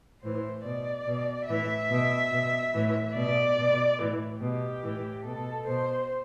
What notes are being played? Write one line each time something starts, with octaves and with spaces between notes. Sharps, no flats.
A2 E3 C5
B2 D5
B2
A2 E3 E5
B2
B2
A2 E3
B2 D5
B2
A2 E3
B2 G4
A2 E3
B2 A4
B2 C5